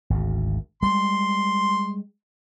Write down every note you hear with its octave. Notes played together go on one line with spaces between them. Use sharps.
G#1 D2
G3 G#3 C6